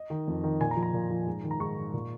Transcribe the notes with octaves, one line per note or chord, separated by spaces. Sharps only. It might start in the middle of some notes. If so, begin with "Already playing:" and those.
Already playing: D#5
D#3
F2
D#3
A#2 G#5
A#5
F3
A#5
A#2
F3
G#2
D#3
A#5
G#2 C#6
D#3
A#2